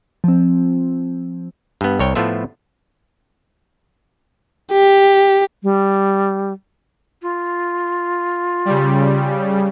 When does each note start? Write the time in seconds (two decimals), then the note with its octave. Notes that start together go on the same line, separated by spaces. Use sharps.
0.24 F3 C4
1.81 G2 B3
1.99 C2 C#5 G5
2.15 A2 F3 A3 B3 F4 E5
4.72 G4
5.63 G3
7.22 F4
8.65 C#3 G3